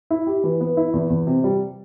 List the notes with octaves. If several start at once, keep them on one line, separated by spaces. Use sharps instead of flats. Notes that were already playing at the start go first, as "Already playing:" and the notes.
E4
G4
E3
B3
E4
E2
E2
C3
G3